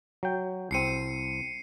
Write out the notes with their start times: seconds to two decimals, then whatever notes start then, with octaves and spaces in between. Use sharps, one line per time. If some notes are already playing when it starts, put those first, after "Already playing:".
0.23 F#3 G5
0.71 C2 C4 C7 C#7 D#7